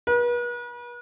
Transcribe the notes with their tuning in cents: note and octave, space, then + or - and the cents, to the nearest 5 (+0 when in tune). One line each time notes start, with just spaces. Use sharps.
B4 -40